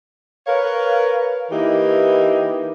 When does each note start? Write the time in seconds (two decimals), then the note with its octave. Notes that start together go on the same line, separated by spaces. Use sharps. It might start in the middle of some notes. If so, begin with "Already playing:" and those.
0.47 A#4 B4 C#5 F5
1.51 E3 A#3 D#4 E4 G4